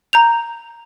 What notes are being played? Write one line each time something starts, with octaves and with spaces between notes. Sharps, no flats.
A#5 G6 F7